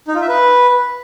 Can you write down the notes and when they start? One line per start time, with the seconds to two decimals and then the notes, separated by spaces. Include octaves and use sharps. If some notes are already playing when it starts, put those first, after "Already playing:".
0.08 D#4
0.15 F4
0.22 E5
0.28 B4